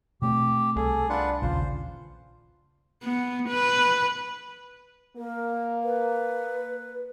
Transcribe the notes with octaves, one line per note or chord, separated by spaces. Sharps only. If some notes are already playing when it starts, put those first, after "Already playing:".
B2 A3 C4 G4
C2 G#4 A4
D4 F4 B4 F#5
A#1 D#2 C#3 F4 C5
B3
B4
A#3 A#4
B4